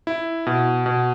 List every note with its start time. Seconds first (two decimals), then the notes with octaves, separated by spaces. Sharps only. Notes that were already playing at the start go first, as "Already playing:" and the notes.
0.07 E4
0.47 B2
0.86 B2